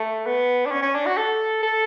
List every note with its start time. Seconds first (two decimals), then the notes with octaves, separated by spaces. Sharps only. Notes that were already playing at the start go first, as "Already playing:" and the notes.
Already playing: A3
0.26 B3
0.66 D4
0.71 C#4
0.82 C#4
0.95 D4
1.06 F#4
1.17 A4
1.63 A4